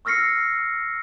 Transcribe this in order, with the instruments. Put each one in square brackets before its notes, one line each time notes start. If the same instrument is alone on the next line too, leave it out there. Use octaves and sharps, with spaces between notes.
[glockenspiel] C#6 E6 F6 A#6 C7 C#7